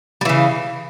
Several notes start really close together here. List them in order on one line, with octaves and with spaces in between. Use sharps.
G3 E3 C#3